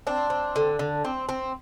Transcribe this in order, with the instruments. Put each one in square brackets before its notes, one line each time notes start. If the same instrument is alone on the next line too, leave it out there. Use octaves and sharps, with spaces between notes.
[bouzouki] C4 D4
C4
D3
D3
C4
C4